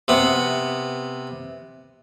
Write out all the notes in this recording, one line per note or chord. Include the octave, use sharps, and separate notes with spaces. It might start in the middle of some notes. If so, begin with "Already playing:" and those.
C3 B3